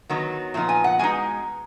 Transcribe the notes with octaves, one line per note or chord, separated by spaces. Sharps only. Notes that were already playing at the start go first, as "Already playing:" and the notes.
D#3 F#3 B3 D#4
A#2 F3 B3 D#4
G#5
F#5
B2 G#3 D#4 G#5